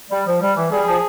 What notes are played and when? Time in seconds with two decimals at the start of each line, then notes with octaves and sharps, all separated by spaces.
0.11 G3
0.27 F3
0.41 G3
0.56 E3
0.71 G3 G#4
0.87 F3